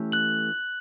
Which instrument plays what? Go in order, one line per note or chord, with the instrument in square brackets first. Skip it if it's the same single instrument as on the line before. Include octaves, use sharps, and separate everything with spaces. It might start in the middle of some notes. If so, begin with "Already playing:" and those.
Already playing: [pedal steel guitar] E3 A3 C#4 G4
[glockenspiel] F#6 F#7